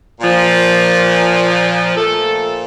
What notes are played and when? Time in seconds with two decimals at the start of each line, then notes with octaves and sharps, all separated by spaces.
0.20 A#2 F3
1.97 A#2 F3 A3 A4